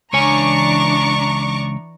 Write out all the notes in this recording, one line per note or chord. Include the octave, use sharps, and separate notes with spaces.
C#2 E3 D4 C#5 G#5 A#5 C#6 D6